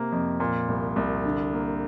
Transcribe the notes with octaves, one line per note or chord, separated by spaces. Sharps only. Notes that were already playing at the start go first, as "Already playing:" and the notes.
Already playing: C3 A#3
F2
A#2
C2
C2
D3
A#3